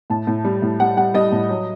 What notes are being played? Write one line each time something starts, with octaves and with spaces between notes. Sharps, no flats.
A2 A5
A2
G3
A2
G3 F#5
G3 F#5
G3 D#5
A2
F#3